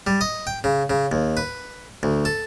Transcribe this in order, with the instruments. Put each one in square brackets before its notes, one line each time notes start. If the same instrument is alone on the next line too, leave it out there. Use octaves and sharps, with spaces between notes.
[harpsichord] G3
D#5
G5
C#3
C#3
D#2
B4
D2
A4